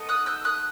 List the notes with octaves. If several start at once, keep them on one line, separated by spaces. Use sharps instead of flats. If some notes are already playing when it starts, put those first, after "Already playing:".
Already playing: B3 D#4 A4
D#6 F#6
E6 G6
D#6 F#6